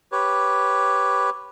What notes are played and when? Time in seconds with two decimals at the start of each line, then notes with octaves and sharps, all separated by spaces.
0.12 G4 B4 C#5